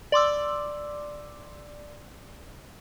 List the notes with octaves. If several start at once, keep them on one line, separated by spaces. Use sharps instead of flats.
D5 C6 D6 E6